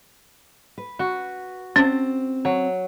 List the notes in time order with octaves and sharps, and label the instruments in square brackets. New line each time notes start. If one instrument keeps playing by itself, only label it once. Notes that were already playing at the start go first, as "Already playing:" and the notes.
[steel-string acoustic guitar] B4
[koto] F#4
[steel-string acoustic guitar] C4 [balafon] C#4
[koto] F#3